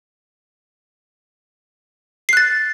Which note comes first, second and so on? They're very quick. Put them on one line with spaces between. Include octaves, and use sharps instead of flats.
C7 F#6 A6